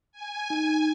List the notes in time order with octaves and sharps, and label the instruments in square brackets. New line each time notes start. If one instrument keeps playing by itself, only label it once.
[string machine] G#5
[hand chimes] D#4